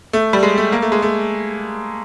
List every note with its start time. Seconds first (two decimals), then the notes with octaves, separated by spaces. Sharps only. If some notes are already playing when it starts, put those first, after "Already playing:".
0.13 A3
0.33 G3
0.43 G#3
0.58 A3
0.72 A#3
0.82 A3
0.92 G#3
1.02 A3